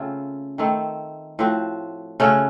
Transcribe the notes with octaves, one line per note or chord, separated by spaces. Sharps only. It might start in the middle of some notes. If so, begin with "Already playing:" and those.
Already playing: C#3 A3 C4 F4
D#3 A3 C4
A2 F3 C4 F#4
C#3 A3 C#4 F#4